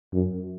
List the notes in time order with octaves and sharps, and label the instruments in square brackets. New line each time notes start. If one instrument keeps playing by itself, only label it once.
[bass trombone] F#2